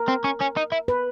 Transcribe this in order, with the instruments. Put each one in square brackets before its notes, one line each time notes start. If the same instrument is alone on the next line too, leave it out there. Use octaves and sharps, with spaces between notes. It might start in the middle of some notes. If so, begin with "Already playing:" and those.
Already playing: [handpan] A#4
[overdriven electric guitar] C4
C#4
C#4
D#4
E4
[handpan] B4